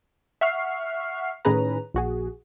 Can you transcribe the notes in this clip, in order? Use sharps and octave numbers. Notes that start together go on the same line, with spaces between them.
E5 F#5 C#6 F6 C7
A2 D#3 C#4 G#4 B4 A#5
A#1 F#4 G#4